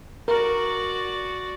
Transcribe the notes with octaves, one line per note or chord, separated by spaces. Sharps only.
F#4 A#4 D5